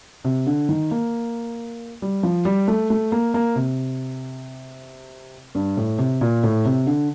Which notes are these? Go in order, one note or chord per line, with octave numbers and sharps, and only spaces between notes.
C3
D3
D#3
A#3
G3
F3
G3
A3
A3
A#3
A#3
C3
G2
A2
C3
A#2
A2
C3
D3